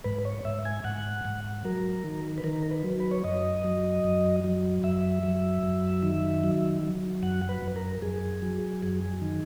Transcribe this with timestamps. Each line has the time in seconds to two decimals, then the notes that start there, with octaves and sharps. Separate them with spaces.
0.04 G#2 B4
0.25 C#5
0.45 G#2 E5
0.65 G#5
0.84 G#2 F#5
1.25 G#2
1.65 F#3 A#4
2.04 D#3
2.38 B4
2.44 D#3 A#4
2.71 B4
2.84 F#3
3.00 B4
3.11 C#5
3.24 F#2 D#5
3.64 F#3
4.04 F#2
4.44 F#3
4.83 F#2 E5
5.23 F#3
5.63 F#2
6.03 D#3
6.44 F#3
6.83 F#3
7.23 F#2 F#5
7.49 B4
7.62 F#2
7.76 A#4
8.02 F#2 G#4
8.42 F#3
8.82 F#2 G#4
9.22 D#3